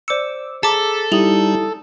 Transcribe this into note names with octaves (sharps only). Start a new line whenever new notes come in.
C5 D5 D6 E6 C#7
G#4 A4 A5 A#5 D6 B6
G3 D#4 E4 G4 D#6 F7 F#7